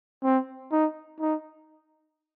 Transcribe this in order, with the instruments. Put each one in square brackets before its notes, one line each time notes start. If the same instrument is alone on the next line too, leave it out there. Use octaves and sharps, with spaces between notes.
[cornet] C4
D#4
D#4